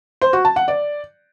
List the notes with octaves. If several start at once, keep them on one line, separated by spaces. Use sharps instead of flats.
C5
F#4
A5
F#5
D5